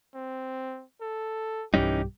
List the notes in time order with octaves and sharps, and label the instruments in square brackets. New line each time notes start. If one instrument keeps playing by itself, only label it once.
[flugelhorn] C4
A4
[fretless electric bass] B1 G2 G3 [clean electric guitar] E3 C#4 D#4 [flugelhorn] G4